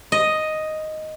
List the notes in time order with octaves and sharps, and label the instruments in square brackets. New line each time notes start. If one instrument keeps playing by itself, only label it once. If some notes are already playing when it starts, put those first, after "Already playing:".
[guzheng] D#5